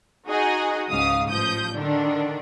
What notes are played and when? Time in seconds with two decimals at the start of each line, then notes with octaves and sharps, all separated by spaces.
0.28 D#4 F#4 G#4 D#5
0.90 C#2 G#2 C#3 F5 D#6
1.29 A1 F3 D#6 G6
1.74 D3 D#3 D4